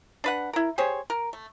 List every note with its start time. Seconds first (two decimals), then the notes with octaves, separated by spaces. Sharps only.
0.24 D4 B4 F#5
0.53 E4 A#4
0.78 G4 G#4 C5 C#5
1.10 A#4
1.33 A3